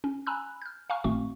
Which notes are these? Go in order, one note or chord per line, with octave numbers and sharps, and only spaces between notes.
C#4
G#5 A#5 B5 E6 F#6
F6 G6
F5 G#5 A#5 C#6 F6
G#1 A2 A3 C4 F#4 C#6